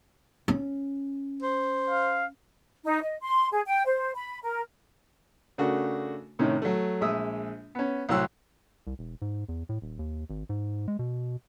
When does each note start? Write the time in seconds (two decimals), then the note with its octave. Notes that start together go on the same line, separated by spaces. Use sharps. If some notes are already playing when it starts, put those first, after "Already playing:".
0.48 C#4
1.42 C5
1.89 F5
2.85 D#4
3.03 D#5
3.22 C6
3.52 G#4
3.67 G5
3.86 C5
4.15 B5
4.44 A#4
5.58 C#3 A3 D4 F#4 A#4
6.39 A2 C3 D#3 C#4 D#4
6.62 F#3 A3
7.01 A#1 G#3 E5 D#6 E6
7.75 B3 C#4
8.09 C2 A2 F#3 C6 E6 F#6
8.87 C2
8.99 E1
9.22 G#2
9.49 E2
9.69 A2
9.82 D#1
9.99 D#2
10.30 G#1
10.49 G#2
10.88 G#3
10.99 B2